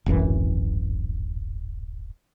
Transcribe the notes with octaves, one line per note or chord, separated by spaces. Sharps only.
D1 G#1 F#2 E3